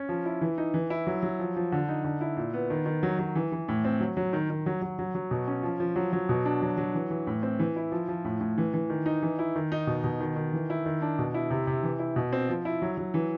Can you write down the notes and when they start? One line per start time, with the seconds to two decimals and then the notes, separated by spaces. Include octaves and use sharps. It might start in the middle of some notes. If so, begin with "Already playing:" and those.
Already playing: C#4
0.09 F3
0.25 E4
0.41 E3
0.58 D#4
0.74 E3
0.90 E4
1.07 F#3
1.23 F#3
1.39 F3
1.56 F3
1.72 D3
1.89 D#4
2.04 D3
2.21 E4
2.37 A#2
2.54 B3
2.70 D#3
2.86 D#3
3.03 F#3
3.19 F#3
3.35 E3
3.52 E3
3.68 A2
3.85 C4
4.00 F#3
4.17 F#3
4.33 D#3
4.50 D#3
4.66 F#3
4.82 F#3
4.99 F#3
5.15 F#3
5.31 B2
5.48 C#4
5.63 F3
5.80 F3
5.96 F#3
6.13 F#3
6.29 B2
6.45 D4
6.62 F#3
6.78 F#3
6.94 E3
7.10 E3
7.27 A2
7.43 C4
7.59 E3
7.76 E4
7.92 F3
8.08 F3
8.25 A2
8.41 A2
8.58 E3
8.74 E3
8.90 D#3
9.06 D#4
9.22 E3
9.39 E4
9.56 D#3
9.72 D#4
9.87 B2
10.04 B2
10.20 D#3
10.36 D#3
10.53 E3
10.70 E4
10.86 D#3
11.02 D4
11.19 B2
11.34 E4
11.51 C3
11.67 C3
11.83 E3
11.99 E4
12.16 B2
12.33 C4
12.49 F3
12.65 E4
12.82 F#3
12.98 F#3
13.14 E3